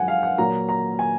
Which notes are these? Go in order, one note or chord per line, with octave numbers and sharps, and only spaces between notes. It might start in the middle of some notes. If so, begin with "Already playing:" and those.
Already playing: F#2 F3 G#3 F#5 G#5
F5
F#5
A#2 F#3 A#3 A#5
A#5
G#5